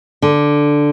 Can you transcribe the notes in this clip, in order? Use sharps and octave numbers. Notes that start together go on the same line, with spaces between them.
D3